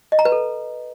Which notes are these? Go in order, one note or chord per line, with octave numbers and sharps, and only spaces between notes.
D#5
A#5
B4
A4